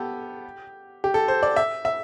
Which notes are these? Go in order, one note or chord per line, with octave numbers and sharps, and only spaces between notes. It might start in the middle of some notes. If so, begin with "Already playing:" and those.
Already playing: B3 G4 A4
G4
A4
C5
D5
E5
E5